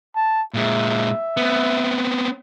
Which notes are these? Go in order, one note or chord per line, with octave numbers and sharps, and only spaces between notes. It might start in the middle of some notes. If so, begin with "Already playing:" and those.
A5
A#2 G#3 E5
B3 C4